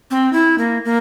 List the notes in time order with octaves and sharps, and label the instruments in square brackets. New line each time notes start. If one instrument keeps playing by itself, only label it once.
[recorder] C4
E4
A#3
A#3